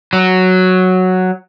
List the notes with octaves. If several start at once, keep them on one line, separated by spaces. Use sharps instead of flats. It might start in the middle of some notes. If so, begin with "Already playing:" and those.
F#3